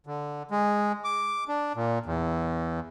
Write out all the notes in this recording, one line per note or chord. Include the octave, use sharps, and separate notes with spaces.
D3
G#3
D6
D4
A#2
E2